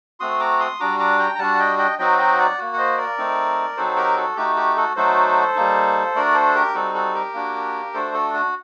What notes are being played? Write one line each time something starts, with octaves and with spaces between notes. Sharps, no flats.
A3 C4 F#4 C6 D#6
A#5 D6
C6 D#6
G3 D4 F#4 A#5 D6
A#5 D6
G5 A#5
A#5
G3 D4 F#4 F#5 A5
D#5 G5
D#5 G5
F#3 C4 D#4 F#4 D#5 G5
D#5 G5
D5 F#5
A#3 F#4
F#5
C5 D#5
A#4 D5
A3 C4 D#4
F#3 C4 D#4 F#4 A4 C5
G4 A#4
F#4 A4
A3 D#4 F#4 G4
G4
F#4 A4
F#3 A3 D#4 F#4 A4 C5
G3 A#3 D#4
A3 D4 F#4 A#4 D5
A4 C5
G4 A#4
G3 C4 D#4 F#4 A4
F#4 A4
G4 A#4
A#3 D4 F#4
A3 D4 F#4 A4 C5
F#4 A4
F#4